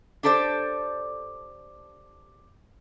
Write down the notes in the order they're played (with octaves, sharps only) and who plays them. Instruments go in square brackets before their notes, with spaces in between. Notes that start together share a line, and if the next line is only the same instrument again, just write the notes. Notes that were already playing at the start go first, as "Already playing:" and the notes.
[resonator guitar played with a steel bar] D4 G4 A4 C5 D5